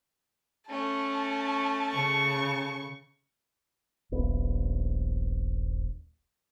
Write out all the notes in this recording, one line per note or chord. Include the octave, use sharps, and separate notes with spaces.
A3 C#4 A5
C#3 C#6
D#1 A#1 B3